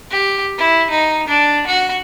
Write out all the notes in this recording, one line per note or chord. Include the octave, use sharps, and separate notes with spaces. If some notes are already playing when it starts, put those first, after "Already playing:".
G4
E4
D#4
D4
F#4